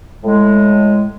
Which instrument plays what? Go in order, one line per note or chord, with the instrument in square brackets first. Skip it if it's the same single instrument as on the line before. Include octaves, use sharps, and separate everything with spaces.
[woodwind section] A2 G#3